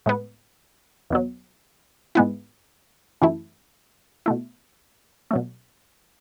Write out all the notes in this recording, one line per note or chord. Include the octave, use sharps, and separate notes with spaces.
A2 G#3 B3
E2 B2 F#3
G#2 G#3 B3 E4
F#2 E3 A3 E4
B2 A3 E4
B2 F#3 A3